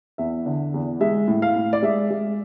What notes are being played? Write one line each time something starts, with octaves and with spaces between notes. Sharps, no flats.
E2 E5
D3
E2
G#3 E5
A2
F5
A2
D5
G#3 E5
G#3